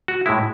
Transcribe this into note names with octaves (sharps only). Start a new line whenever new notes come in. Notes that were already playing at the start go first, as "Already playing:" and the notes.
F#4
A2 G#3 E4